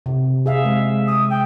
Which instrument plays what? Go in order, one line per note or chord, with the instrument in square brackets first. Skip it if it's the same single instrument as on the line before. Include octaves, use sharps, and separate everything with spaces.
[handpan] C3
[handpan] G#4 E5 [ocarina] F5
[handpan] G#3
[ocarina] D#6
G5